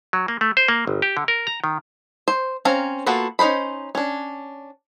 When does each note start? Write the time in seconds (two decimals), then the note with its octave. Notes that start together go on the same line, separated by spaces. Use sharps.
0.13 F#3
0.28 A#3
0.41 A3
0.57 C5
0.68 A#3
0.87 G1
1.02 G4
1.17 D3
1.28 A#4
1.47 A#5
1.64 D#3
2.28 C5
2.65 C4 C#4 F5 A#5
3.06 A#3 B3 F4 F#4 A4
3.39 C#4 D#4 B4 C5 B5
3.95 C#4 D4